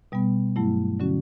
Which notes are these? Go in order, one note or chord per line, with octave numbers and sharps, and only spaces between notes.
B2 G3 B3
G2 F#3 A3 E4
D3 F#3 C#4 F#4